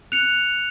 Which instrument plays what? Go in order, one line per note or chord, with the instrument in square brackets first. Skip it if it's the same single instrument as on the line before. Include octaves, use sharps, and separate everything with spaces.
[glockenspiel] F#6 C#7 F7